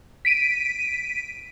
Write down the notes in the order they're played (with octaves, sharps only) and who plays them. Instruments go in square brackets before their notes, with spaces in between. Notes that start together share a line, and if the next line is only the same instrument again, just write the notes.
[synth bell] B6 D7 D#7